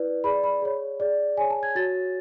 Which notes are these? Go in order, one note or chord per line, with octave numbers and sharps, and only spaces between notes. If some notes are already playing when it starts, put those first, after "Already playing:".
Already playing: E4 B4 D5
G#4 D5 B5
B5
G#4 C#5
G#4 D5
G#4 C#5 G#5
A5
G#6
F#4 C#5 A6